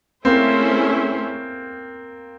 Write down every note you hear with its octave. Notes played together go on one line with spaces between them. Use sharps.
A3 A#3 C4 C#4 E4 G#4 C5